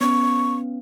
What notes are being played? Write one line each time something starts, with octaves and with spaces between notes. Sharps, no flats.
B3 C#4 C#6